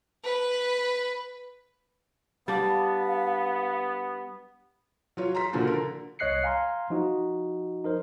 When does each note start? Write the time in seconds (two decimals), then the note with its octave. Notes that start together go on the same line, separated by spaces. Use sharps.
0.24 B4
2.48 G3 B3 D4 F5
5.17 F#3 F4 C#5
5.34 A#5 C6 B6
5.53 A#2 D3 F3 A#3 F4 F#4
5.67 D3 A#4
6.19 C2 C#5 D#5 F#6 C7 C#7
6.44 F5 G#5 A#5 C6
6.90 F3 D#4 F#4
7.84 D#4 A#4 C5